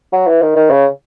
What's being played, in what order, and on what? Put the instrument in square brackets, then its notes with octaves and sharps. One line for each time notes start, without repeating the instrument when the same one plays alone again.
[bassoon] F#3
E3
D#3
D#3
C#3